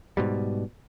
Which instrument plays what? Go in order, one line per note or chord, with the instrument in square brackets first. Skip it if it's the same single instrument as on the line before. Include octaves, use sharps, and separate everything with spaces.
[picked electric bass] G#2 B2 G3